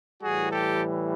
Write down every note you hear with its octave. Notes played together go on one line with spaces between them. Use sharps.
A2 E3 G3 F#4 G#4
G4 A4